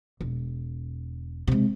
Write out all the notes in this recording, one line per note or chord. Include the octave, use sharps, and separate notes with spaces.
E1
C3 G#3